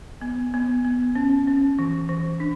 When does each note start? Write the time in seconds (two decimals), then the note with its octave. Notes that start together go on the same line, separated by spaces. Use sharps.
0.21 B3
0.54 B3
0.85 B3
1.15 C#4
1.47 C#4
1.79 E3
2.09 E3
2.40 D4